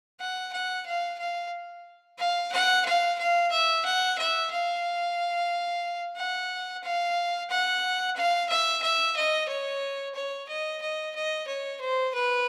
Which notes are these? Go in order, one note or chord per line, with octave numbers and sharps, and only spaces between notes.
F#5
F#5
F5
F5
F5
F#5
F5
F5
E5
F#5
E5
F5
F#5
F5
F#5
F5
E5
E5
D#5
C#5
C#5
D#5
D#5
D#5
C#5
C5
B4